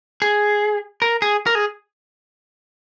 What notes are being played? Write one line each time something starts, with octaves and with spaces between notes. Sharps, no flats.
G#4
A#4
G#4
A#4
G#4